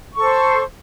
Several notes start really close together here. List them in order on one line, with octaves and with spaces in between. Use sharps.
C#6 A4 C5